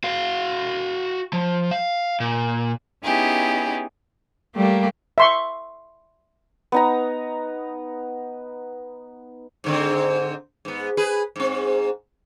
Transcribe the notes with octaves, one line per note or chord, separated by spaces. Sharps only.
F#4 F5
F3
F5
A#2
B3 C#4 D#4 E4 G4 G#4
G3 A3 A#3 G4
E5 C6 C#6
B3 D#4 A#5
G#2 D3 C4
G#2 B3
G#4 B4
G#2 C4